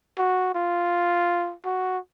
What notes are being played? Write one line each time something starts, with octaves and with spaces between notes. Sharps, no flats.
F#4
F4
F#4